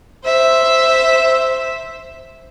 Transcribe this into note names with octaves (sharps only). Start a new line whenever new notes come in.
C5 E5